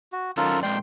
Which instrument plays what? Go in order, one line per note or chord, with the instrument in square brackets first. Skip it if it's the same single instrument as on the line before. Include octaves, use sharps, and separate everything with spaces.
[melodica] F#4
[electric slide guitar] F#2 D#3 C#4 [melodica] F4 A4 A#4
[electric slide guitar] A#2 G#3 D5 [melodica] G5 C6